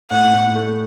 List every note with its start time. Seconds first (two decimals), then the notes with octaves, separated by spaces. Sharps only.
0.11 A2 F#5
0.34 A2
0.55 A3